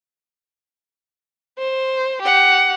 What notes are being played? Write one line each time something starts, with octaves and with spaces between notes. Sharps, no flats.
C5
G4 F#5